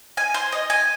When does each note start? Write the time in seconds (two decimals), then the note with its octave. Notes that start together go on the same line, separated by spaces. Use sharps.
0.17 G#5
0.34 C5
0.52 D#5
0.70 G#5